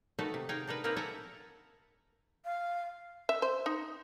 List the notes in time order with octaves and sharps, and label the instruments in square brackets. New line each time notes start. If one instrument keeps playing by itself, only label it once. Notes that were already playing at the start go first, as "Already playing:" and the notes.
[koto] D#3 A3 D#4 F#4 A4 B4
C3
D#4 G#4 F5 G5 G#5
D4 D#4 A#4 B4
A#3 C4 D#4 G4 A#4 B4
A4 E5 F#5 G#5 A#5
[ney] F5
[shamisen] E5
C5
D#4